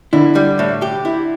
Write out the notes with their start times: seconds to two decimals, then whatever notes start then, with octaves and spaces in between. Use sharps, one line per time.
0.13 D3 E4
0.35 G3
0.59 A2
0.82 G4
1.05 E4